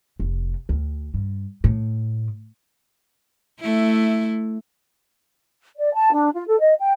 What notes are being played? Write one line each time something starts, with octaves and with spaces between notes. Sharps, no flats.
F1
D2
G2
A2
A3 E4
D5
A5
D4
F4
A4
D#5
G5